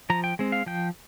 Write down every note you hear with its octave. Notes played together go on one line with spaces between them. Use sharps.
F3 A#5
G5
G#3 C4
F5
F3 G5